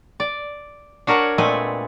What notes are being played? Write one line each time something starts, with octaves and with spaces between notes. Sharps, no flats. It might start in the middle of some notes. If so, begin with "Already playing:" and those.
D5
D4 F#4 A#4 C#5 F#5
A#2 G#3 A3 C4 B4 G#5